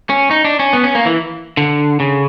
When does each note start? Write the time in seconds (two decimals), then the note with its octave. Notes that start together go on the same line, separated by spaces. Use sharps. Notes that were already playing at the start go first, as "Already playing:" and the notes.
0.10 C#4
0.31 D#4
0.45 D4
0.59 C#4
0.73 B3
0.84 C#4
0.95 A#3
1.05 E3
1.57 D3
2.00 C#3